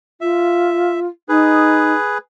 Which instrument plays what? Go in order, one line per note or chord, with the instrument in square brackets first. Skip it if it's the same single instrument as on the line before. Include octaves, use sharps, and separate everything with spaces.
[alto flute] F4 [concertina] E5
[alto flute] D#4 [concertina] G#4 B4